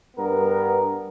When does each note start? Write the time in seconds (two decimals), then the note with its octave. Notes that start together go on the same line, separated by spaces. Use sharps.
0.16 G2 B3 A#4